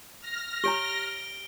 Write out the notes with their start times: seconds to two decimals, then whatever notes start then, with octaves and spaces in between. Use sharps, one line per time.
0.21 F6 A#6
0.64 G4 C#5 A#5 D7 G7